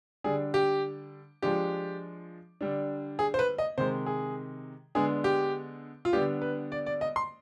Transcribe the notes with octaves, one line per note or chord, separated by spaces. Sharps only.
D3 G3 D4 G#4
G4
F3 G#3 D4 G4
D3 G3 D4
G#4
C5
B4
D#5
C3 D#3 G#3 C5
G#4
D3 G#3 B3 D4 G#4
G4
F4
D3 G3 B3 D4 G4
B4
D5
D5
D#5
C6